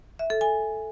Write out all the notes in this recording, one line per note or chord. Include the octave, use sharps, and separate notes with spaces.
E5
A4
G#5